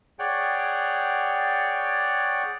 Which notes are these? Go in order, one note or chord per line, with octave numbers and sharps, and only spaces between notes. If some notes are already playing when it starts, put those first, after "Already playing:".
G#4 C#5 D5 F#5 G5